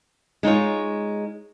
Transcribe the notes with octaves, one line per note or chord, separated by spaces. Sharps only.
G#3 D#4 F4 C#5